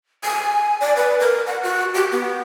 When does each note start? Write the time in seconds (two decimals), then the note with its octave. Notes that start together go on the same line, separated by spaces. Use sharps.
0.24 G#5
0.81 D5
0.96 B4
1.20 A#4
1.47 F#5
1.63 F#4
1.94 G4
2.12 B3